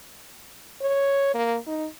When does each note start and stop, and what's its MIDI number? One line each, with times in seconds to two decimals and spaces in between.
0.81 1.31 73
1.34 1.57 58
1.67 1.86 63